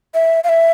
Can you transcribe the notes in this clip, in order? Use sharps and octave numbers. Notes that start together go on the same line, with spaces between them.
E5
F5
E5